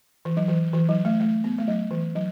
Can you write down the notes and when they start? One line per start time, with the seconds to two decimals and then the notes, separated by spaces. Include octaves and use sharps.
0.25 E3
0.37 F#3
0.48 E3
0.73 E3
0.89 F#3
1.05 A3
1.20 A3
1.44 B3
1.58 A3
1.68 F#3
1.91 E3
2.15 F#3